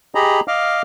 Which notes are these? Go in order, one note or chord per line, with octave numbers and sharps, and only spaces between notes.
G4 G#4 D#5 A#5 B5
D#5 F5 D6 F6